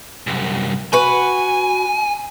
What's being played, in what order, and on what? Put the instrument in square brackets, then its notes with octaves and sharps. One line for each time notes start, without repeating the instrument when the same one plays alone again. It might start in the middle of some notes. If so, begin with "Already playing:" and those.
[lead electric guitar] C2 F#2
[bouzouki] F#4 B4 [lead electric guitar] G#5